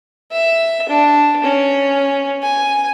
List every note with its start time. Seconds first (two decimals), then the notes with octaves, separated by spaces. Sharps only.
0.32 E5
0.89 D4
1.44 C#4
2.43 G#5